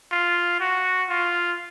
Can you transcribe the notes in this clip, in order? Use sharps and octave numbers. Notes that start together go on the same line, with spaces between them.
F4
F#4
F4